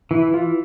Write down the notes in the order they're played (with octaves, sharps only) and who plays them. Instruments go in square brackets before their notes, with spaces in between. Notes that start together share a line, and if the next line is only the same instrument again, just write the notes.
[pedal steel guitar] E3 [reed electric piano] E4
[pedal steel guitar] E3 [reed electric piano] F4